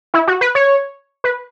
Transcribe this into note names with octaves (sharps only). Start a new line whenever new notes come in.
E4
F#4
B4
C#5
B4